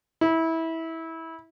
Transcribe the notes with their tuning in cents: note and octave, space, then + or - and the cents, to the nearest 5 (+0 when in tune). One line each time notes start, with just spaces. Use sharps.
E4 -20